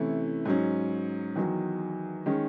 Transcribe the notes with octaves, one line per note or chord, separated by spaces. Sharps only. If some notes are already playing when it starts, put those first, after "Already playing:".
Already playing: C3 E3 A3 C#4 E4
G#2 F#3 C#4
E2 D#3 F#3
D#3 G#3 C#4